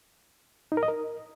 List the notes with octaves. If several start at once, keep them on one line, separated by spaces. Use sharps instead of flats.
D#4
A#4
D#5
A#4